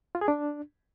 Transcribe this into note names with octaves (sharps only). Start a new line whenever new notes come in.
F4
G#4
D4